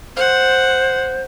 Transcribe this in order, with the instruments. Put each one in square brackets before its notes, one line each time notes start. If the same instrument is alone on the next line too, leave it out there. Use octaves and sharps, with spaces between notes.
[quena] C5 [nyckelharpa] F#5